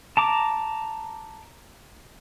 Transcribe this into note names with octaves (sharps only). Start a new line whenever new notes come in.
A5 A#5 D6